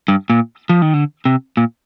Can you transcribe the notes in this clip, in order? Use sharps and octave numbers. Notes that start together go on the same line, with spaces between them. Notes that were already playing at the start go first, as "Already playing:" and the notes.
G2
A#2
F3
D#3
D3
C3
A#2